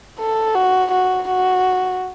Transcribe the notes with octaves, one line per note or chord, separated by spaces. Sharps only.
A4
F#4
F#4
F#4